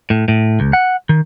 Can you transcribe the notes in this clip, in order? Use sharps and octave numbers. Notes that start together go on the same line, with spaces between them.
A2
A2
C#2
F#5
D#3